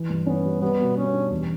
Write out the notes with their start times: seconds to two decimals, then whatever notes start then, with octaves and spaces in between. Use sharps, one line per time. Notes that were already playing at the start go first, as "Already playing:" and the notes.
Already playing: E3
0.10 G2
0.26 B3 C#4
0.45 G3
0.61 G3 B3
0.79 B2
0.96 B2 C#4
1.13 D4
1.31 E2